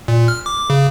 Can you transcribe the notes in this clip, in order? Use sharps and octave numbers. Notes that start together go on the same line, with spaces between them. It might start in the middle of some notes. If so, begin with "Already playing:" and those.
A#2
F6
D6
C#3